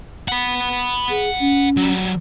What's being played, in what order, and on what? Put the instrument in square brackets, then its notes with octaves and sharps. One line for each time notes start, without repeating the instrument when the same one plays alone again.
[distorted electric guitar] F#5 B5
[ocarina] G#4
C#4
[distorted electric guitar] F#3 G3